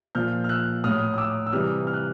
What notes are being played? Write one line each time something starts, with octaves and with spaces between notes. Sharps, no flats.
A#2 F3 F6 G6
F6
E6 F#6
A2 F#3 D#6 F6
D#6
D6 E6
E6
C3 E3 G3 D#6 F6
F6
F#6